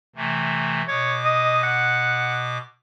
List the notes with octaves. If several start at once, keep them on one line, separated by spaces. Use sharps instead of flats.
C3 E3 A3
B2 C#5 D6
D#5
F#5